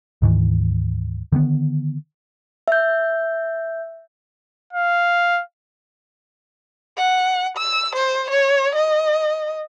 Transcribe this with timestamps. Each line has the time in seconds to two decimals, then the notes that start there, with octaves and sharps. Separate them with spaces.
0.22 D2 G#2 D#3 E3
1.32 D3 D#3 A#3 B3
2.68 E5 G6
4.73 F5
6.98 F#5
7.57 E6
7.95 C5
8.30 C#5
8.75 D#5